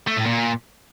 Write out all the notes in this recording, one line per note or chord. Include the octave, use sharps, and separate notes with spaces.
A3
A2
A#2